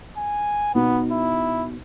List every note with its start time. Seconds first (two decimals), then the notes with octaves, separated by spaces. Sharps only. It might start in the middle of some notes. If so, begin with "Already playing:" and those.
0.18 G#5
0.75 B2 B3 D#4
1.12 E4